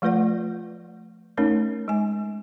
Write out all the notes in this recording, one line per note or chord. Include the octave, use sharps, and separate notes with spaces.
F3 A3 F4 B4 D5 F#5
A3 C#4 D#4 A#4 C#5
G#3 G#5